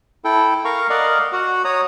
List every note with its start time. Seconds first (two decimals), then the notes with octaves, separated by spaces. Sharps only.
0.25 E4 A4 G5
0.65 A#4 F5 A#5 C#6
0.90 A#4 D5 D#5 F5 F#5
1.32 F#4 F#5
1.65 C#5 A#5 D#6